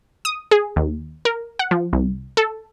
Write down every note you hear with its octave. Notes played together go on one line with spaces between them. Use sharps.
D#6
G#4
D#2
A#4
F#5
F3
C2
A4